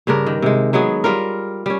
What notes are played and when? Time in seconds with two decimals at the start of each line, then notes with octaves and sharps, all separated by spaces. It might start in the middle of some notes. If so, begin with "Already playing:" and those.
0.07 G2 C#3 D4 A#4
0.26 D#3
0.42 C3 G#3
0.73 F#3 G#3 B3 G#4
1.04 G3 F4 A#4
1.66 G3 C#4